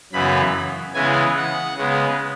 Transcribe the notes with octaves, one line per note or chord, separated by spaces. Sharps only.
F#2 C#3 E3 B3 B5
C#3 E3 G#3 B3 G#5
F#5
C#3 G#3 B3